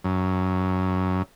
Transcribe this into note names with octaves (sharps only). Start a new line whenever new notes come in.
F#2